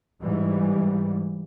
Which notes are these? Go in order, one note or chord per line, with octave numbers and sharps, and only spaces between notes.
G#2 E3 G3